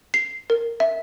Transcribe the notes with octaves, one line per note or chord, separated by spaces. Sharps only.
C7
A#4
E5